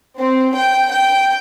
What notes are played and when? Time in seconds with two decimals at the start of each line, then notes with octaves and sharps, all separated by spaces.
0.19 C4
0.56 G5
0.91 G5